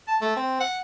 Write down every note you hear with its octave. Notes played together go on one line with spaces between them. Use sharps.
A5
A3
C4
F#5